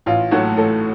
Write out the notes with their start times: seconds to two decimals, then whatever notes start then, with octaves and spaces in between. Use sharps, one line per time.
0.06 A1 F4
0.31 A2 F#3 A3 F#4
0.57 A1 A4